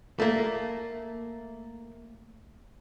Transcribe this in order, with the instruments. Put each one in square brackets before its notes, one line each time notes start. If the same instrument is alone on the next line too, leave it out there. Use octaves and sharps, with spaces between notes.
[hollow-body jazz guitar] A3 A#3